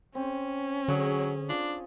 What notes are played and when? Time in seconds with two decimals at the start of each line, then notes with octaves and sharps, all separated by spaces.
0.15 C4 C#4
0.88 D3 F#3 G#4
1.49 D4 F4